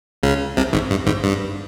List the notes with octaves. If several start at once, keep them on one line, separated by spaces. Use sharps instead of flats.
C#2 C#3
C2 C3
G#1 G#2
G2
G#1 G#2
G2